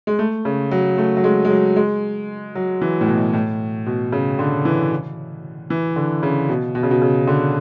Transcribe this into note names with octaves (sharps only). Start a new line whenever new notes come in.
G#3
A3
C#3
F#3
A3
F#3
G#3
G#3
F#3
G#3
F#3
E3
A2
B2
A2
B2
C#3
D3
E3
E3
D3
C#3
B2
B2
C#3
B2
C#3
D3